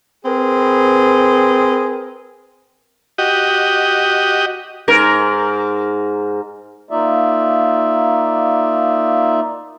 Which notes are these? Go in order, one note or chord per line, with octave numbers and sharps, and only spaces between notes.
C4 G#4 A#4 B4
F#4 G4 D#5
G#2 A#4
A#3 D#4 F4 D5 E5